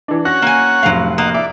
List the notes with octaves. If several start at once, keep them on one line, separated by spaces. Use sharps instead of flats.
E3 D4
C#4 F#4 F#5 A#6
A#3 G#5
F1 A2 F#3 F5
A#3 D#5 F#5
D5 E5